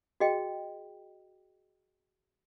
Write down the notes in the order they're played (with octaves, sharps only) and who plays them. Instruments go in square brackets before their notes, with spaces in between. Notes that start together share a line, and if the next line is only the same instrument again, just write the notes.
[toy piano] F#4 G#4 D#5 G5